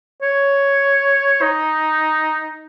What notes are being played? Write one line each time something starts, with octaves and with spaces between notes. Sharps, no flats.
C#5
D#4